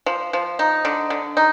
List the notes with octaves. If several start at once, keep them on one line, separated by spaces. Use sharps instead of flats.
F3
F3
D#4
D3
D3
D#4